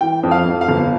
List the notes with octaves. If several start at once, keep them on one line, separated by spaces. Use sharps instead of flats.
E3 G5
F2
F5
F2
F5
G1